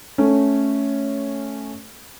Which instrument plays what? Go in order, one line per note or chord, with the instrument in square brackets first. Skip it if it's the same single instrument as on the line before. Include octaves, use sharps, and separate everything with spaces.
[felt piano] A3 C#4